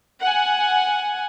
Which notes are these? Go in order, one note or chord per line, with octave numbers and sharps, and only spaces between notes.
F#5 G#5